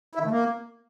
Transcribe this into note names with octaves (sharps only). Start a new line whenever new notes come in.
E4
D#3
A3
A#3